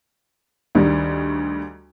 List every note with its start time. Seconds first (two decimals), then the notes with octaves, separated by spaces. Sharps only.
0.75 D2 D#3 G3